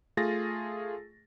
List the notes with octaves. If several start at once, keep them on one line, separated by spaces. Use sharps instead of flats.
A3 F4 G#4 A6 A#6